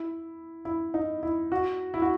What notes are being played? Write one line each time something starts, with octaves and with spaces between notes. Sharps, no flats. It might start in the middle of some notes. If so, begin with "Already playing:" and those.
Already playing: E4
E4
D#4
E4
F#4
E4
F#4